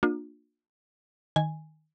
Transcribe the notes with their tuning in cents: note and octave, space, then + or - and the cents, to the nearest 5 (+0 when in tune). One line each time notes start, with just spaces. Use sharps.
A#3 +0 D4 +30 F4 +40
D#3 +0 G#5 -5